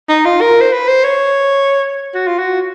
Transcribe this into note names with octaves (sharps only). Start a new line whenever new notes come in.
D#4
F4
A#4
C5
B4
C5
C#5
F#4
F4
F#4